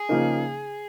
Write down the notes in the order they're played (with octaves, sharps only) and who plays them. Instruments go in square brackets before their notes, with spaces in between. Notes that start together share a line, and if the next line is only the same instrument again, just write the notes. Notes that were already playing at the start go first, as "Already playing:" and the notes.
Already playing: [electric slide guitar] G#4
[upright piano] C#3 F3 A#3 D#4